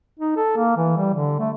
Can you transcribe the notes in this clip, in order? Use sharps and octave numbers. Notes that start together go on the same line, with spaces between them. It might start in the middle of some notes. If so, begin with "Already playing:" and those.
D#4
A4
A#3
E3
G3
D3
A3